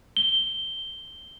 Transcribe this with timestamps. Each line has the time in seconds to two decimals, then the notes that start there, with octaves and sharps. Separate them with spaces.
0.17 G7